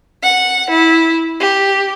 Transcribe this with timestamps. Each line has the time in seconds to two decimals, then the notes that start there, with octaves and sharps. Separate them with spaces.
0.23 F#5
0.70 E4
1.40 G4